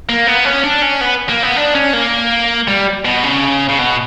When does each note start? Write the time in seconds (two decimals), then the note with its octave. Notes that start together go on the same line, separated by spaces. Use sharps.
0.09 A#3
0.27 B3
0.45 C#4
0.64 D4
0.82 C#4
1.01 B3
1.29 A#3
1.43 B3
1.56 D4
1.75 C#4
1.93 A#3
2.68 G3
3.05 B2
3.23 C#3
3.69 C#3
3.78 B2